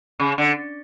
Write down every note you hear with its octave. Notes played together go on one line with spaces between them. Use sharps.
C#3
D3